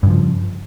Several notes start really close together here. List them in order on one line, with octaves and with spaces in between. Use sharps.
G2 C#3 F3